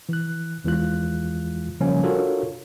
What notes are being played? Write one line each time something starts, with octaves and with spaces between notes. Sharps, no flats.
E3 F#6
E2 E3 G#3 F4 F#6
C#3 F3 G3 A#3 C#4
D4 F4 F#4 A4 A#4 C#5